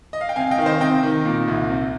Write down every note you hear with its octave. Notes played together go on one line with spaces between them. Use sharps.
D#5
F5
G5
C3 F5 G#5
D#5 G5
D#3 F5
C5 D#5
C3 D#5 G5
D#3
A#2
C2
C3